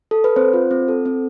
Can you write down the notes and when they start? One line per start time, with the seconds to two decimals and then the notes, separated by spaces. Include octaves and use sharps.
0.11 A4
0.24 B4
0.36 C4 C5
0.53 F4
0.71 C4
0.88 A4
1.05 C4